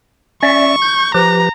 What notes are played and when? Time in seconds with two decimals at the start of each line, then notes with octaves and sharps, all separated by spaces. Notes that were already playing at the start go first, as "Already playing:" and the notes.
0.43 C#4 D5 E5 C#6
0.82 G6
1.14 F3 G4 B4 A#5